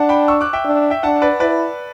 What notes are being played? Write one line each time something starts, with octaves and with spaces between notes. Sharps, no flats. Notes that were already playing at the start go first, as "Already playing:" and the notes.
Already playing: D4 F#5 A5
G5 B5
C#6 E6
D6 F#6
E5 G5
D4
E5 G5
D4 F#5 A5
B4 D5
E4 B4 D5